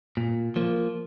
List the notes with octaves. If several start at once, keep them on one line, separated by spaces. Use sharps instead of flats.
A#2
F3 A#3